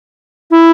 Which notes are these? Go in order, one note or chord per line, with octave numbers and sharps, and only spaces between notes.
E4